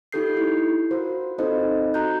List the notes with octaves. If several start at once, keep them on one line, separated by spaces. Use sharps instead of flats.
D#4 F4 G4 A4 G6 C7
E4
F4 F#4 A#4 C5
C4 D#4 F4 A4 C5 D#5
F#4 A#5 F#6 G6